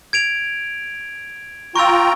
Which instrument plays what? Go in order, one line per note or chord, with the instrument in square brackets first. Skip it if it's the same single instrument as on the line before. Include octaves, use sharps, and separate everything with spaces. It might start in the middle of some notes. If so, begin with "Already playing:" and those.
[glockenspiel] G#6 D7 F7
[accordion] F4 G5 A#5 [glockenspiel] C#6 E6